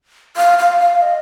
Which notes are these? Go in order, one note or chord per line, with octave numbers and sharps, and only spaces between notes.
F5
F5
F5
D#5